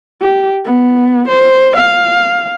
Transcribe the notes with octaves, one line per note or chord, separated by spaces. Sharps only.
G4
B3
C5
F5